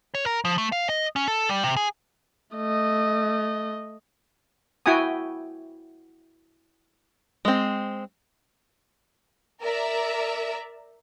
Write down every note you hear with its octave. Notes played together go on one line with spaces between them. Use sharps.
C#5
A#4
F3
A3
F5
D#5
C#4
A4
G3
C3
G#4
A3 D#5
E4 F#4 G5 G#5 D#6
G#3 C4
A#4 D5 E5 A#5